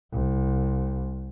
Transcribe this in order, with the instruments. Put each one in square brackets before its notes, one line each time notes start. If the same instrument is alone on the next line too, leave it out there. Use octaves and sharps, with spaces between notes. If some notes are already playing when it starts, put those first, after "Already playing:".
[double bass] C2